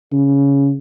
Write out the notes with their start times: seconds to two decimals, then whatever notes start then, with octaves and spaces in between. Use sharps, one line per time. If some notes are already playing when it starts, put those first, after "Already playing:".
0.13 C#3